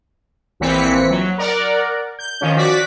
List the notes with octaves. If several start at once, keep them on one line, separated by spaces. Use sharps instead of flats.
A#1 A#2 E3 C4 B6 C#7
F#3
A#4 D5 F#5
G6
D#3 F3 C#4
F#4 D5 B6